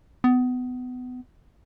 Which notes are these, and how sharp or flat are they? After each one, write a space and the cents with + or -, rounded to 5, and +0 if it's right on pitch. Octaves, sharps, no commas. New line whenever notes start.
B3 +25